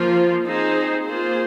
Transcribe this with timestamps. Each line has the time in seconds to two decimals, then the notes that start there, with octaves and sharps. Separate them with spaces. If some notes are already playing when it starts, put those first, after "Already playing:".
Already playing: F3 A#3 F4
0.45 C4 D#4 G#4 C5
1.05 A#3 F4 G#4 C5